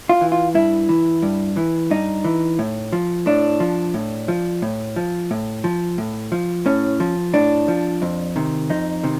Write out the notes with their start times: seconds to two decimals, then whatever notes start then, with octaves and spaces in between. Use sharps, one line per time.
0.09 F4
0.21 E3
0.32 F4
0.54 G2 E4
0.89 E3
1.22 G2
1.57 E3
1.91 G2 D#4
2.24 E3
2.59 A2
2.93 F3
3.26 A2 D4
3.60 F3
3.94 A2
4.28 F3
4.62 A2
4.96 F3
5.31 A2
5.64 F3
5.98 A2
6.32 F3
6.66 A2 C#4
7.00 F3
7.34 A2 D4
7.68 F3
8.02 F2
8.36 C3 D#3
8.70 F2 D#4
9.04 C3 D#3